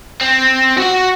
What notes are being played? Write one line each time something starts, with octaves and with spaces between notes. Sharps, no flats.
C4
F#4 F#5